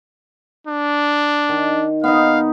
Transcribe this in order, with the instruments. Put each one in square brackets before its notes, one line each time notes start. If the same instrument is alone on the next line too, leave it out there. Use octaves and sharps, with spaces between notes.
[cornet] D4
[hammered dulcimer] D#3
[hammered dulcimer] B3 D#4 [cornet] F5